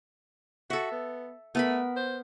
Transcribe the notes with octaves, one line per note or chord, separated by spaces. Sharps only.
F#4 A4 E5
B3
A3 B3 A#4 B5
C5